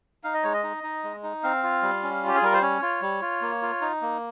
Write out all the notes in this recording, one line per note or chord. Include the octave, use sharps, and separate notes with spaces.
D#4 F5
D#5
G#3 C#5
D#5
D#4
D#4
G#3
D#4
C4 F5
F4
G3
C#4
F4 G4
G#4
G3 A#4
C5
C#4 C#5
F4
G3
F4
A#3
F4
D#4
A#3